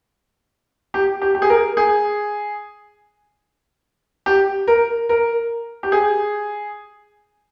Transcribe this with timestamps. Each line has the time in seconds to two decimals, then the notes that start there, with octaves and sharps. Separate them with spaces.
0.94 G4
1.22 G4
1.35 G4
1.42 G#4
1.50 A#4
1.77 G#4
4.26 G4
4.67 A#4
5.09 A#4
5.83 G4
5.92 G#4